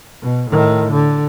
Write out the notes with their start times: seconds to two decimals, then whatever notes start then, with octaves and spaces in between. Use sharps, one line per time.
0.22 B2
0.51 A2 D#3
0.91 D3